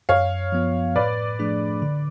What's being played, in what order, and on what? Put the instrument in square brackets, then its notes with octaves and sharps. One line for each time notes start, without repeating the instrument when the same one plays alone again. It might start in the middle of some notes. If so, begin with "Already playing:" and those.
[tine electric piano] F#2 [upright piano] C#5 F5
[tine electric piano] F3 B3 F4
[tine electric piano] A2 [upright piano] B4 D5
[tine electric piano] F3 A3 D4 G#4
D3